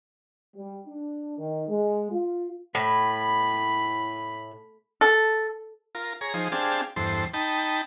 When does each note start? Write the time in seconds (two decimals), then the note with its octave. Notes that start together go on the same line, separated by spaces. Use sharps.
0.56 G3
0.87 D4
1.37 D#3
1.68 G#3
2.12 F4
2.75 A2 B5
5.01 A4
5.95 F4 A#4
6.21 G#4 C#5 A#5
6.34 F3 D#4 G#4 C5
6.52 C4 D4 G4 G#4 F5 A5
6.96 E2 G2 A4 C5 C6
7.34 D#4 G5 A5 B5